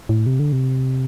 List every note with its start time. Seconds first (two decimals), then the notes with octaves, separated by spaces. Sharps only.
0.09 A2
0.26 C3
0.39 D3
0.52 C3